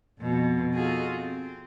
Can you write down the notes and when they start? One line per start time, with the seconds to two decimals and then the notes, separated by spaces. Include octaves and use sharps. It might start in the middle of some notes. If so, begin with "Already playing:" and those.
0.19 F2 B2
0.75 D#4 F4 F#4 G#4 A4
1.12 C4